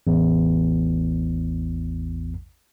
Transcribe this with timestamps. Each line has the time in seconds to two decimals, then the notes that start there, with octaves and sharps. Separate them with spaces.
0.07 A1 E2